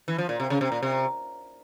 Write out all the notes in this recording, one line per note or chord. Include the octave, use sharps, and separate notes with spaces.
E3
F3
A#2
C3
C#3
C3
A#2
C3